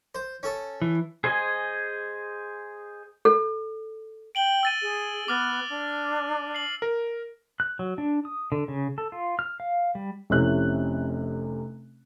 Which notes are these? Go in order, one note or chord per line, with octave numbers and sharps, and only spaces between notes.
C5
C#4 A4
E3
G#4 C5 D#5 G#5
A4
G5 D7 F#7 G7
E6 A6 D#7
G#4
B3 D6 F6 A6
D4
C7 F#7
A#4
F#6
F#3
D4
D#6
D3
C#3
A4
F4
F6
F5
G3
F1 C3 C#4 E4 F#6